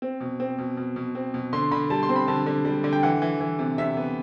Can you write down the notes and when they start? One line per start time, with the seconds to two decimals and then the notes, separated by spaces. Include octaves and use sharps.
0.02 C4
0.20 B2
0.40 C4
0.58 B2
0.77 B2
0.96 B2
1.15 C4
1.34 B2
1.53 D3 C6
1.71 D3 B5
1.90 G3 A5
2.03 C6
2.09 C4
2.16 B5
2.28 D3 A5
2.46 D3
2.65 G3
2.84 D3
2.93 G5
3.03 E3 F#5
3.22 E3
3.41 E3
3.59 C3
3.78 C3 E5
3.97 B3